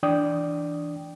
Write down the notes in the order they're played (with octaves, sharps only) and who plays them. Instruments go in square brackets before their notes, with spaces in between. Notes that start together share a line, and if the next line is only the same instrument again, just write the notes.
[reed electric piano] E3 D4 D5 G5 D#6